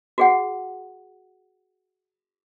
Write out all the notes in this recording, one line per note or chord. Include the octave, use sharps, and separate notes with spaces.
F#4 G#4 F#5